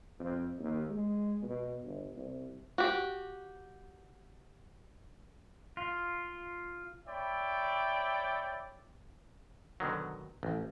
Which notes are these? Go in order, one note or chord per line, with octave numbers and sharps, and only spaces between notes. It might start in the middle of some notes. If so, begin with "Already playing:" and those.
F2
D#2
G#3
B2
G1
C2
F#4 G4
F4
C#5 D5 E5 G5 B5
B2 D3 D#3 F#3
A1